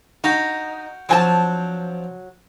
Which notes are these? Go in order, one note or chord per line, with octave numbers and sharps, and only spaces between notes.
D#4 F#4 F5 G5
F3 F#3 C4 D4 G#5 A5